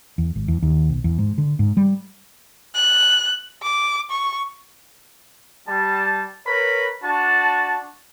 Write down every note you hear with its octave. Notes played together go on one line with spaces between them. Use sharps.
E2
G#1
E2
D#2
B1
E2
G#2
D3
G#2
G3
F#6
D6
C#6
G3 A5
A#4 B4 C#5 B5
D4 F#4 A5